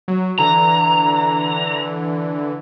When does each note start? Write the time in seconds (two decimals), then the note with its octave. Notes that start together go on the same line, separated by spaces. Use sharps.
0.08 F#3
0.39 D3 E3 A#5